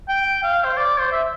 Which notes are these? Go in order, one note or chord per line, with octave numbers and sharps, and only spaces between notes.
G5
F5
C5
D5
C5
E5